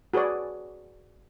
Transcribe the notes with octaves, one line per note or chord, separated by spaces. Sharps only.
F#4 G#4 B4 C#5 D5